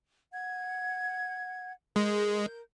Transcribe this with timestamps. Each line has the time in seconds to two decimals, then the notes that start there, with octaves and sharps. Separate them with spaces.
0.32 F#5 G#6
1.96 G#3 A#4 G6